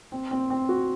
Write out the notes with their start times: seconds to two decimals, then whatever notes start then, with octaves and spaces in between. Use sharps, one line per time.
0.12 C4
0.31 C4
0.50 C4
0.69 F#4